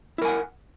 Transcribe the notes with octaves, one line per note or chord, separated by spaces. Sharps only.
E4 A#4 F#5 G#5